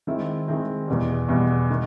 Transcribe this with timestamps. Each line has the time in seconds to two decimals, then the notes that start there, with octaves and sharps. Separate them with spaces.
0.07 D#3 G#3 C4 E4
0.48 D#3 G#3 C4 E4
0.88 E2 B2 G3
1.29 E2 B2 G3
1.70 D#3